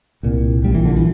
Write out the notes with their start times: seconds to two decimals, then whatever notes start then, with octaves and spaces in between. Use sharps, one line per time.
0.23 C2 A#2
0.64 A#1 A#2 G3
0.75 E3
0.85 D3
0.97 E3